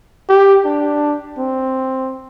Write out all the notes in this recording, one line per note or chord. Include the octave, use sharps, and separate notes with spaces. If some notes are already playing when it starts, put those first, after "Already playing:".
G4
D4
C4